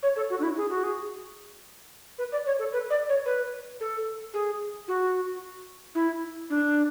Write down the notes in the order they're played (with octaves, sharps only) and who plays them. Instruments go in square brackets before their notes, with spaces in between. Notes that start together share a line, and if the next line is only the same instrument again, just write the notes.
[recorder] C#5
A4
F#4
D4
E4
G#4
F#4
G#4
B4
D5
C#5
A4
B4
D5
C#5
B4
A4
G#4
F#4
E4
D4